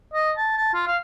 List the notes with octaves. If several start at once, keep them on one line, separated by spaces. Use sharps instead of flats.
D#5
A5
A5
F4
F5